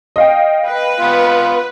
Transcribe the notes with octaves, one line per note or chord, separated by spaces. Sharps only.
D#5 F5 G5
B4
B3 F4